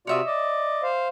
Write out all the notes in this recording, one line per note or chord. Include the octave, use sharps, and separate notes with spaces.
C3 F4 F#4 C#5 D5 E5 D#6
D5 D#5
C5 F5